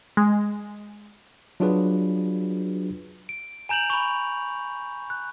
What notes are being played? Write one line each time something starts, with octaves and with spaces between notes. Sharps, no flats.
G#3
F#3 D4 F4 F#4 G#4 B4
D7
G#5 A#5 G6 F7 F#7
B5 C#6
F#6